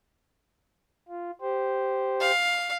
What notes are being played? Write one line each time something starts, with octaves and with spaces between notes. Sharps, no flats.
F4
G4 C5
F5